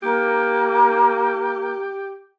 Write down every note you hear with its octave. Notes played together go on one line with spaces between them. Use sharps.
A#3 G4